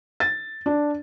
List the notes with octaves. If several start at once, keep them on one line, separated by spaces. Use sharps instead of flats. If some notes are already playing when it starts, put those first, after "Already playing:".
A6
D4